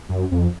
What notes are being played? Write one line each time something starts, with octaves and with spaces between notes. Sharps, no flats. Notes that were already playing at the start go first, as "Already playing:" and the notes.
F#2
F2